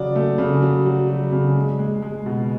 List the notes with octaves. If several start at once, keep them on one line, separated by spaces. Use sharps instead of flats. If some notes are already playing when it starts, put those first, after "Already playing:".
Already playing: C#3 F#3 D5
A3
C#3
F#3
F#3
F#3
C#3
G#3
G#3
G#3
B2